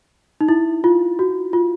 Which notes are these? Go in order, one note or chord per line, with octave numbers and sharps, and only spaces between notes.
D#4
E4
F4
F#4
F4